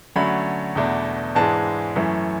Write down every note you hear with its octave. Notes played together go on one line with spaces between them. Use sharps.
D3 F#3 A3 C#4 B5
E2 B2 A3 D4
G#2 E3 G#3 D4 A5
F#2 E3 A3 C#4